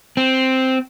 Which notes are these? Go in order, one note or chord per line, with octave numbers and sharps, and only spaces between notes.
C4